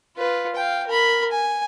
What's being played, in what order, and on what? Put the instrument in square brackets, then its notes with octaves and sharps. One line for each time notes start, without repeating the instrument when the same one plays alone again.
[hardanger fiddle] F4 B4
F5 G5
A#4 B5
G#5